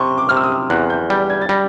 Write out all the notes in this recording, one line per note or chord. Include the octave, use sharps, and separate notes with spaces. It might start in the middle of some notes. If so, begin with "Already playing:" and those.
Already playing: C3 C6 C#6
D6
C3 F6
E6
D#6
E2 F#6
G6
G3 G6
G#6
A6
G3 A#6